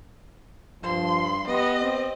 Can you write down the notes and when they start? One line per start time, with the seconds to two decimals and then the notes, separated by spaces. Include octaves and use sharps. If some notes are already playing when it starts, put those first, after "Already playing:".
0.83 G2 F3 C6
1.48 B3 G4 D#5
1.82 C4